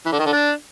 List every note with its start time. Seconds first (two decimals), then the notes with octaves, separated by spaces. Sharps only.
0.06 E3
0.12 D3
0.19 D#3
0.26 D3
0.32 D4